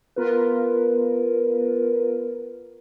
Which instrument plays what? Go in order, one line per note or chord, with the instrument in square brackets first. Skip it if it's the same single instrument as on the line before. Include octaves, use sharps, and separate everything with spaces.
[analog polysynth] B3 F4 A#4 B4